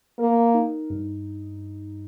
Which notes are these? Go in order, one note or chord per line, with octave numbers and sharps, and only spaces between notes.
A#3 A#4
D#4
G2